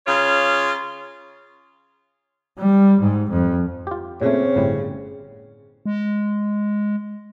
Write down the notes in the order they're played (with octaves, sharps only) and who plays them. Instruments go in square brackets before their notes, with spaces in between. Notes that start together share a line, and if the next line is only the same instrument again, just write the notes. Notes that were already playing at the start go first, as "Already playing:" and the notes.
[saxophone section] C#3 F4 C#5
[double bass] G3
G#2
F2
[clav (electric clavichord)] F4 G4
[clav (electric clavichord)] A#2 A3 [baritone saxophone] C#3 [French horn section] C4 C#5
[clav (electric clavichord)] G1 A2 G3
[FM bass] G#3